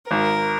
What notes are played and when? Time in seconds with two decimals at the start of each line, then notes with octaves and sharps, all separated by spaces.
0.11 G#1 A#4